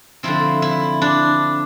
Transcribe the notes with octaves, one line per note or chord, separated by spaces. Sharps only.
D3 F3 C4 E4
E4
D4